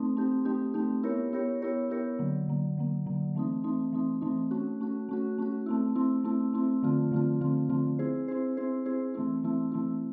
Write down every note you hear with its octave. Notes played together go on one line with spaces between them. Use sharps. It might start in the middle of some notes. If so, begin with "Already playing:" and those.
Already playing: A3 C4 D#4
A3 C4 D#4 G4
A3 C4 D#4 G4
A3 C4 D#4 G4
B3 E4 G4 A#4 C#5
B3 E4 G4 A#4 C#5
B3 E4 G4 A#4 C#5
B3 E4 G4 A#4 C#5
D3 F#3 A#3
D3 F#3 A#3
D3 F#3 A#3
D3 F#3 A#3
E3 A3 C4 D#4
E3 A3 C4 D#4
E3 A3 C4 D#4
E3 A3 C4 D#4
A3 C#4 F#4
A3 C#4 F#4
A3 C#4 F#4
A3 C#4 F#4
A3 C4 E4
A3 C4 E4
A3 C4 E4
A3 C4 E4
D3 F3 A3 C4 F4
D3 F3 A3 C4 F4
D3 F3 A3 C4 F4
D3 F3 A3 C4 F4
C4 E4 G#4 C5
C4 E4 G#4 C5
C4 E4 G#4 C5
C4 E4 G#4 C5
E3 A3 C4 E4
E3 A3 C4 E4
E3 A3 C4 E4